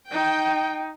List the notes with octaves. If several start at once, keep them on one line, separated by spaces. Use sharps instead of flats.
D#4 G5